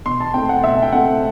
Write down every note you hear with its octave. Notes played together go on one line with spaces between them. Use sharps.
B2 C6
A5
A3 C4 G5
F#5
B2 E5
G5
A3 C4 F#5